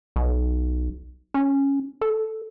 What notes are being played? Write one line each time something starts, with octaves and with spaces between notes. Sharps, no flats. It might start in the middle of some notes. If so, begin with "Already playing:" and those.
B1
C#4
A4